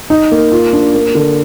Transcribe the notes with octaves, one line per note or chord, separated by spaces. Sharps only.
D#4
A#3
F4
D4
A#3
D3